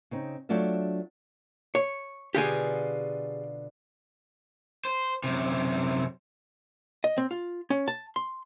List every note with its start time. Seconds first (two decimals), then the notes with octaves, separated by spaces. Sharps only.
0.11 C#3 C4 D#4
0.49 F#3 A3 D4 F4 E5
1.75 C#5
2.35 B2 D3 F4 G4 G#4
4.85 C5
5.24 F#2 C3
7.04 D#5
7.18 C4
7.31 F4
7.70 C#4
7.88 A5
8.16 C6